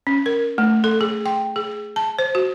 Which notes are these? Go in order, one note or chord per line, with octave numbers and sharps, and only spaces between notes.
C#4
A#4
A3
A4
G#4
G5
G#4
A5
C5
F#4